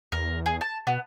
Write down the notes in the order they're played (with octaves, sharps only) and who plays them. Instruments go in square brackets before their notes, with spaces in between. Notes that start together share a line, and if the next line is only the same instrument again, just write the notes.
[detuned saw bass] E2 [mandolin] A#4
[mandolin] G#4
A5
[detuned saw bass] B2 [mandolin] B3